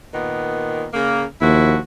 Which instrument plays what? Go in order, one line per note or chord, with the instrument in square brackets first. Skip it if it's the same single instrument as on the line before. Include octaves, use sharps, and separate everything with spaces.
[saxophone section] A#2 D#3 B3
C#3 A#3
[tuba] D#2 [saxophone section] F3 E4 F#4